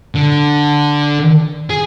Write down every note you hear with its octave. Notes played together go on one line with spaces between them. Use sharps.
D3
G#4